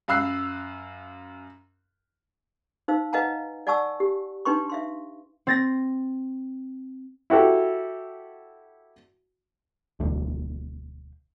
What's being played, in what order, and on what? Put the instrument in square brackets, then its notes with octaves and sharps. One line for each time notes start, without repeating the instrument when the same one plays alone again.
[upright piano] F#2 F5 B5 E6 F#6 C7
[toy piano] D#4 C5 F5 E6
B4 D#5 F5 F#5 G#5 A#5
D5 F#5 G#5 A5 C#6 E6
G4
D4 D#4 B4 G5 C6 C#6
E5 F5 C6
[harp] C4 A6 A#6
[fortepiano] E4 F#4 G4 A4
[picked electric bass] E1 D2